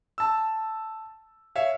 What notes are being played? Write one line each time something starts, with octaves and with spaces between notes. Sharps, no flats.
A5 E6
C#5 E5 F5